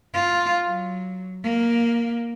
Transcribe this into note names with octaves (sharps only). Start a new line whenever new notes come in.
F4
F#3
A#3